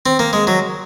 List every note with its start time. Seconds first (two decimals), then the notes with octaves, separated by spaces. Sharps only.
0.06 C4
0.19 A#3
0.33 G#3
0.47 F#3